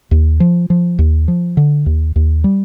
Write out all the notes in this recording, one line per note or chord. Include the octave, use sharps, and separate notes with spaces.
D#2
F3
F3
D#2
F3
D3
D#2
D#2
G3